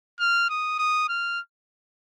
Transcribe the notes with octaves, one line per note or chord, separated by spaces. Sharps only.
F6
D#6
D#6
F6